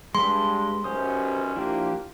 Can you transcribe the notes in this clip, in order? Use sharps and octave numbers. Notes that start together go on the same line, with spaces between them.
G2 G#3 B5 C6
B1 F#2 C#4 G4 C5 D#6
F3 A#3 D4 E4 F4 G4